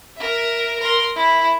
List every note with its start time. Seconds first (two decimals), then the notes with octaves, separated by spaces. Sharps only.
0.17 A#4 E5
0.80 A#4 C6
1.15 E4